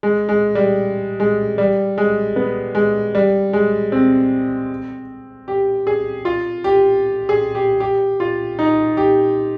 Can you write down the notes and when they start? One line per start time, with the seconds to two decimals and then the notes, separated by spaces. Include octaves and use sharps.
0.03 G#3
0.29 G#3
0.55 G3
1.20 G#3
1.58 G3
1.98 G#3
2.36 B3
2.75 G#3
3.15 G3
3.53 G#3
3.92 C4
5.48 G4
5.87 G#4
6.25 F4
6.64 G4
7.29 G#4
7.55 G4
7.80 G4
8.20 F4
8.59 D#4
8.97 G4